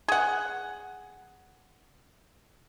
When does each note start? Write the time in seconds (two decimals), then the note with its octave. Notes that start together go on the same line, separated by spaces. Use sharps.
0.08 G#4 F#5